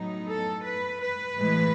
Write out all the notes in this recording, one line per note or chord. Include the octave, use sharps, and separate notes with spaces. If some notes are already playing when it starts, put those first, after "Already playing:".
Already playing: A2 F#3 B3 D#4
A4
B4
B4
A2 E3 G#3